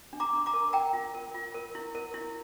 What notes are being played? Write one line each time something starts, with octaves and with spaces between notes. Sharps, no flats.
D4
A#5 D6
D4
A#5 D6
A#4
A#4 G5 A#5
F4
A#4
F4
A#4
E4
A#4
E4